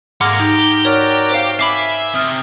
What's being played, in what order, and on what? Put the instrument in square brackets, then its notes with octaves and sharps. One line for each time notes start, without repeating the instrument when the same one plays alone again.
[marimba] G#2 [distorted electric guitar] G#3 A#3 [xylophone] F#5 D6 F6 [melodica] A#5
[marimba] D#4 [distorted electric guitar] G4
[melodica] F#4 A#4 D5 [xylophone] C#5
[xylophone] C5 F5
[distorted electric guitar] E5 [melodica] G#5 [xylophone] B5 D6 C7
[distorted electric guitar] C3 [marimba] D#6 F6